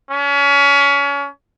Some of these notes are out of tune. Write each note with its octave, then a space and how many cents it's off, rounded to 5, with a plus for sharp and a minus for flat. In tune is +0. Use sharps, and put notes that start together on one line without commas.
C#4 +30